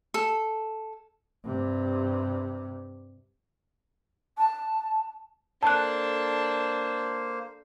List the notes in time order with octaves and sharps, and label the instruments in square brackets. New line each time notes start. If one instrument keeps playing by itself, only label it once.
[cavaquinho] A4
[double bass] G2 C3
[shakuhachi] A5
[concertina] A#3 C5 [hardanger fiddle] D4 A4 [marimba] A5 F#6